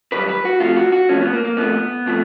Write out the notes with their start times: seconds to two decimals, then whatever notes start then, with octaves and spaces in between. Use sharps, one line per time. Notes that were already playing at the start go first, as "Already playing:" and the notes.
0.12 F#2 D#3 G3 B4
0.29 B4
0.45 F#4
0.60 C3 F3 A3 F4
0.76 F#4
0.92 F#4
1.09 C3 F3 A3 C#4
1.21 B3
1.33 A#3
1.45 A#3
1.57 C3 F3 A3 B3
2.06 C3 F3 A3